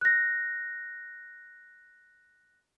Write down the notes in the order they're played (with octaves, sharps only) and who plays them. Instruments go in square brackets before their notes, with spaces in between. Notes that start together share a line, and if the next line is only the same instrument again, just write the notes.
[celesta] F#6 A#6